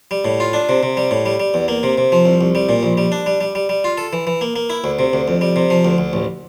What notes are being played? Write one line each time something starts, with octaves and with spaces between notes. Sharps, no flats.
G3
A2
F4
D4
C3
C3
G3
A2
G3
G3
E2
A#3
C3
C3
F3
C2
C2
G3
A#2
A#1
G3
D4
G3
G3
G3
G3
F4
A4
E3
E3
A#3
A#3
E4
D2
C3
D2
F2
G3
C3
F3
D2
D2
A1